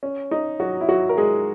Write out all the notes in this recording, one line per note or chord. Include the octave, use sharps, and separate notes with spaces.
C#4
D#4
F#3 F#4
E4
F#3 F#4
A#4
G#3 G#4